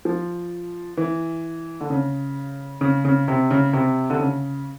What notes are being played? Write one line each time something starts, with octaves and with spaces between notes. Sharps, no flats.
F3
E3
D3
C#3
C#3
C#3
C3
C#3
C3
D3
C#3